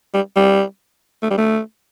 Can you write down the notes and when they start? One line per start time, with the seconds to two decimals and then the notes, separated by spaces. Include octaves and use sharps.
0.14 G3
0.36 G3
1.23 A3
1.31 G3
1.38 A3